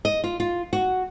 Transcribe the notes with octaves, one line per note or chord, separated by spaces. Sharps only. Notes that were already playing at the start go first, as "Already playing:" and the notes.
D#5
F4
F4
F#4